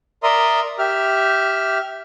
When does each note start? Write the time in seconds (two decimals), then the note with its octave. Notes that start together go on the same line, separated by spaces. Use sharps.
0.23 A#4 D5 E5 A#5 C6 D#6
0.79 G4 E5 F6